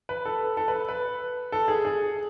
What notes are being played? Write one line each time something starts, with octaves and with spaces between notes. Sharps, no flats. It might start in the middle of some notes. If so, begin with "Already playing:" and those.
B4
A4
A4
B4
B4
A4
G#4
G#4